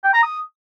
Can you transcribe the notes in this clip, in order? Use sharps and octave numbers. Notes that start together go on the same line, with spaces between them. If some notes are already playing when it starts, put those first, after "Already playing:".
G5
A#5
D#6